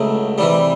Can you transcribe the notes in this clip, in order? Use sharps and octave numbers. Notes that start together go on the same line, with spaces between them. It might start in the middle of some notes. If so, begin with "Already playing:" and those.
Already playing: C#2 C#3 F#3 A3
C3 E3 G3